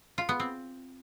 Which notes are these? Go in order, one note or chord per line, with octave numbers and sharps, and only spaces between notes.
F4
B3
C4